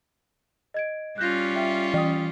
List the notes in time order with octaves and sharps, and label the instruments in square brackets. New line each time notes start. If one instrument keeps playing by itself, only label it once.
[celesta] D#5 G#6 D7
[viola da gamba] G3 C#4 F4 [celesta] F#6 G6 A#6
[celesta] E5 G5
[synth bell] E3 [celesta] G5 D#6